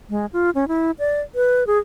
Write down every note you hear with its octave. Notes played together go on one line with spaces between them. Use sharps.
G#3
F4
C#4
E4
D5
B4
G#4